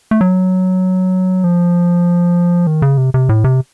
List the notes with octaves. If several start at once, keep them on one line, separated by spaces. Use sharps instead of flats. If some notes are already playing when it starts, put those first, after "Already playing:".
A3
F#3
F3
D#3
C#3
C3
C3
A2
C3